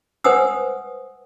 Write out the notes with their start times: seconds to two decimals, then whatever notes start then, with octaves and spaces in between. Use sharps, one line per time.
0.24 B4 C5 F#5 G#5 D#6 E6